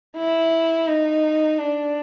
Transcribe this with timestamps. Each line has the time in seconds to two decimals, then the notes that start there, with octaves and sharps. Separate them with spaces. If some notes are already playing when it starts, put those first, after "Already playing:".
0.17 E4
0.87 D#4
1.58 D4